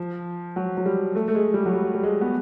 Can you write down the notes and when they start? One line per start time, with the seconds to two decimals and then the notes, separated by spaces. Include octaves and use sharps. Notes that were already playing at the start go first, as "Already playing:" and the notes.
Already playing: F3
0.56 F#3
0.77 F#3
0.86 G3
1.15 A3
1.28 A3
1.35 G#3
1.54 G3
1.66 F#3
1.73 G3
1.95 G3
2.03 G#3
2.21 B3